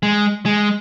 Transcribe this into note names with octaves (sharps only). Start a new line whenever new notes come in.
G#3
G#3